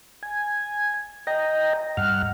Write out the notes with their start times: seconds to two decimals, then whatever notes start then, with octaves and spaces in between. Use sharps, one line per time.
0.23 G#5
1.27 D#5 G5 A#5
1.97 G2 F#5 F6